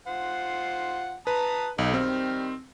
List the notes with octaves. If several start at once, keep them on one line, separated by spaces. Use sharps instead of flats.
F4 C5 F#5
B4 A5 A#5 D#6
B1 D#4 A4
D#3 G3 C4 F6